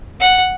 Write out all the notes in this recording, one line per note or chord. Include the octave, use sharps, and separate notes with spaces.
F#5